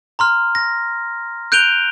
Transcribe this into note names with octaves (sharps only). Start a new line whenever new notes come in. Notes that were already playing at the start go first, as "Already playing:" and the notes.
A#5 C6 F6
A#6
F#6 G6 D7 D#7 F7 G7